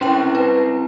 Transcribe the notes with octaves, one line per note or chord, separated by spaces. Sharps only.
C4 C#4 E4 C5 G5
B4